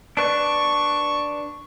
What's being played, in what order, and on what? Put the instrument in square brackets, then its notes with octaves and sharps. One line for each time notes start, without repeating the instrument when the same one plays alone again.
[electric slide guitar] D4 B4 D5 [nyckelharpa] C#6